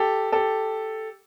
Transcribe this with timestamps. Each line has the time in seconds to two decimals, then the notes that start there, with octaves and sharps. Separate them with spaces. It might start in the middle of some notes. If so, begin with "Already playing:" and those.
Already playing: G4 A4
0.32 G4 A4